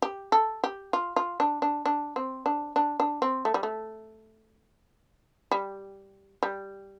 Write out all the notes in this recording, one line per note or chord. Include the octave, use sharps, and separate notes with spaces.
G4
A4
G4
F4
F4
D4
D4
D4
C4
D4
D4
D4
C4
A3
G3
A3
G3
G3